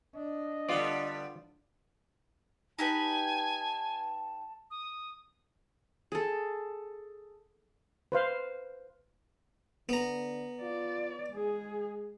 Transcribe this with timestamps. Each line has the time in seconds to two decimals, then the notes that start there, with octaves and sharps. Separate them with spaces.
0.15 D4 D#5
0.69 D3 G3 B3 F4 D5
2.79 D#4 G4 B4 G#5 A5
4.70 D#6
6.12 G#4 A4
8.12 B4 C5 F5
9.89 D3 B3 A#5
10.62 F4 D5
11.34 G#3 G#4